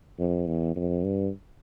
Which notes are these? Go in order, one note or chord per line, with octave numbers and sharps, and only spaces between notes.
F2
E2
F2
G2